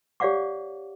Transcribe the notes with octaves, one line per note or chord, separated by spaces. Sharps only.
G4 C#5 D5 F5 F#5 D6